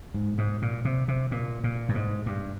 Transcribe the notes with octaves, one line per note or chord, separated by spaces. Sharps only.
G#2
G#2
A#2
C3
C3
A#2
A#2
G2
G#2
G2